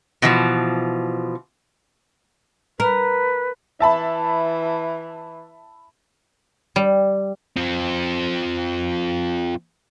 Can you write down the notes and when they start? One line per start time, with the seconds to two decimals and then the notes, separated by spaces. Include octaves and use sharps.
0.22 B2 E3 F3
2.80 A#4 B4
3.80 E3 E5 A5 B5
6.76 G3
7.57 F3 C4